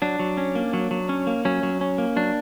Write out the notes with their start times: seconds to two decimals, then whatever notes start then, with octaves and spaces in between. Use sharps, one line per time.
0.02 F#3 D4
0.19 F#3
0.37 C#4
0.55 A#3
0.73 F#3
0.91 F#3
1.09 C#4
1.27 A#3
1.45 F#3 C#4
1.63 F#3
1.81 C#4
1.98 A#3
2.16 F#3 D4